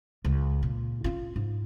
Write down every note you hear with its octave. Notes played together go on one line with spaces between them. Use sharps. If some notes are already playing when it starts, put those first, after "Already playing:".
C#2
A#2
C#4 F4
G#2